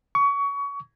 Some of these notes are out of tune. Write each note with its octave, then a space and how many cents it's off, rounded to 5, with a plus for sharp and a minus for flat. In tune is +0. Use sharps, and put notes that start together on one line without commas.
C#6 +25